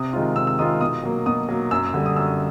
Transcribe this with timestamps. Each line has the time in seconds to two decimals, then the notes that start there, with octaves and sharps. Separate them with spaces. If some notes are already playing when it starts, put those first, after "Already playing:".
Already playing: C3 D#6
0.13 D#3 G#3 C4 F4
0.36 C3 E6
0.47 E6
0.59 D#3 G#3 C4 F4 D#6
0.81 B2 D#6
1.04 F#3 A#3
1.26 B2 D#6
1.49 F#3 A#3
1.71 F#2 E6
1.86 E6
1.94 D3 G3
2.06 D#6
2.16 F#2 E6